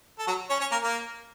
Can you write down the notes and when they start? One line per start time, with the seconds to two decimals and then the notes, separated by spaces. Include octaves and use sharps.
0.19 A4
0.27 F#3 F#4
0.50 C#4 C#5
0.60 C#4 C#5
0.72 A#3 A#4
0.83 A#3 A#4